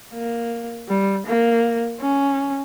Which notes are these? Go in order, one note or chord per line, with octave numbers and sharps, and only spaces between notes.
A#3
G3
A#3
C#4